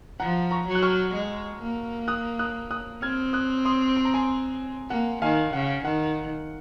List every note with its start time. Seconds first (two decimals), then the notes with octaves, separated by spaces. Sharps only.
0.20 F3 F#5 A#5
0.51 A#5 C#6
0.67 F#3
0.75 F#6
0.83 C#6 F6
1.14 G#3
1.62 A#3
2.08 D#6 F#6
2.39 D#6 F#6
2.71 D#6 F#6
3.02 C4 F6 G#6
3.33 D#6 F#6
3.65 C6 D#6
3.97 C6
4.05 A#5
4.14 G#5 C6
4.90 A#3 F#5
5.22 D#3 F5 G#5
5.53 C#3 F#5
5.85 D#3 F#5